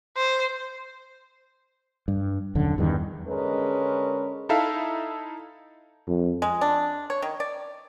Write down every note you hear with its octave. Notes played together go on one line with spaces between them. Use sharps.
C5
G2
D#1 F#2 D3
E2 G2 D#3
D3 G#3 C#4 A#4 B4
D#4 E4 A4 E5 F5
F2
G#3
D4
C#5
D#3
D5